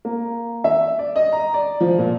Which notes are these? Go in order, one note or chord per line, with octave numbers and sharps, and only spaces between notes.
A#3
E5
D5
D#5
A#5
D5
F3
A#2